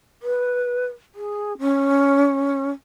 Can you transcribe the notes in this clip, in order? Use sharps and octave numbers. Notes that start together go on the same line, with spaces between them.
B4
G#4
C#4